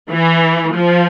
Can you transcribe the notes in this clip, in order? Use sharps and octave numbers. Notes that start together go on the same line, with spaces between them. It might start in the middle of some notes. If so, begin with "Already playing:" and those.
E3
F3